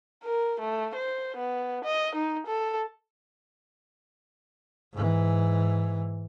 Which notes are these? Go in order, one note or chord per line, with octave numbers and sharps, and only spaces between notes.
A#4
A3
C5
B3
D#5
D#4
A4
G#2 E3